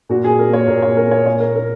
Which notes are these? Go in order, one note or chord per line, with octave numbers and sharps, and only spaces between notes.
A#2 F#4
G#4
A#3
A#4
A#3 C#5
A#2 A#4
C#5
A#2
A#4
A#3 C#5
A#2 C#5
A#4
A#3
A#4